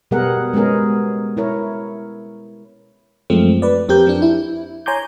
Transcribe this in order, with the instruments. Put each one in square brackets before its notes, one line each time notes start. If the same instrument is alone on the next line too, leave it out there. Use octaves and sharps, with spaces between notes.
[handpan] B2 G3 B3 G#4 A#4 F#5
G#3 B3 C#4 G#4 A#4
E4 A#4 C#5
[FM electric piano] F#2 F3 G#3 A3 C4
B4 D5
F2 C4 G4 A#4 G6
F3 D4
E4
C#5 G#5 A#5 C6 D6 G6